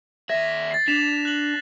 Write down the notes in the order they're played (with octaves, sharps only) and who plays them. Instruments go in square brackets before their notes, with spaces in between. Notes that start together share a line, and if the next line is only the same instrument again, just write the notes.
[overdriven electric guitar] D#2 E5 [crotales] G#6 A#6
[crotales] A6 C7
[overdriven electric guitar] D4 [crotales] B6 E7 F7
[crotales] F#6 F#7